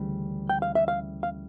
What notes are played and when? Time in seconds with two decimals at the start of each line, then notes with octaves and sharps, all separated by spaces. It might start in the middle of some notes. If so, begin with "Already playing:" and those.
Already playing: D2 C#3 E3 G3
0.49 G5
0.62 F5
0.75 E5
0.88 F5
1.23 F5